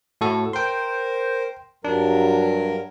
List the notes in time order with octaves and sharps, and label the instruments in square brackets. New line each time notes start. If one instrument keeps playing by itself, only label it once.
[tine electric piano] A2 F#4 A4
[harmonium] A#4 C5 [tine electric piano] G5 C6
[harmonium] G2 F#3 A#4 [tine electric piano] D4